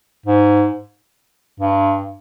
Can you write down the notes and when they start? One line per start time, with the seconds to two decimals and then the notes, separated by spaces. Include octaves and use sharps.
0.26 G#2
1.60 G2